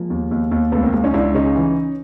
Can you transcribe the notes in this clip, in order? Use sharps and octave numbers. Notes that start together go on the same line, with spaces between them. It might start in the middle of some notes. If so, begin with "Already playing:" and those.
Already playing: F3 G#3 A#3
D#2
D#2
D#2
C#2 A3 B3
A#3 C4
C#2
C#4 D#4
C#2 D4 E4
C#3 C#4 D#4
E3